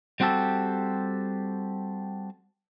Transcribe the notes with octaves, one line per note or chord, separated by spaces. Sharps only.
G3 C4 F#4 G4 A4